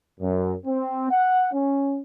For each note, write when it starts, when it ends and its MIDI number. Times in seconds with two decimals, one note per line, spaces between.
0.20 0.54 42
0.66 1.09 60
1.11 1.47 78
1.52 2.00 61